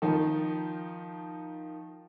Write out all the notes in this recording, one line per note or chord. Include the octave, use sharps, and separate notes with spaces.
D#3 F3 D#4 F4